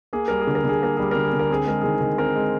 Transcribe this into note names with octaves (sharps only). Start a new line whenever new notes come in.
A#3 G#4
G3 A#4
G#4
D3
A#4
D3 G#4
A#3 A#4
G3 G#4
D3 A#4
G#4
D3
A#4
C4 G#4
G#3 A#4
D#3 G#4
D#3
C4 A#4
G#3